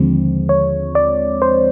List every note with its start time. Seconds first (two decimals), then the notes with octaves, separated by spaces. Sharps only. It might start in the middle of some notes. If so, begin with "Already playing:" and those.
Already playing: D#2 D3 F3 G#3 C4
0.49 C#5
0.95 D5
1.42 C5